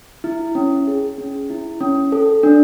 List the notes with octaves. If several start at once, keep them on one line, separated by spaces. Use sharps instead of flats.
E4
C#4
G#4
C#4
E4
C#4
A4
D4